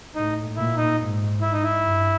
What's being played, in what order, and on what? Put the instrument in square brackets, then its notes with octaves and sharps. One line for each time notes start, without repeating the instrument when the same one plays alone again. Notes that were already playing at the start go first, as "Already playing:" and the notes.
[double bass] A2 [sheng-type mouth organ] D#4
[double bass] A#2 [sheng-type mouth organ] E4
[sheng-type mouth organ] D#4
[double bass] G#2
[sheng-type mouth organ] E4
D#4
E4
[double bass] G2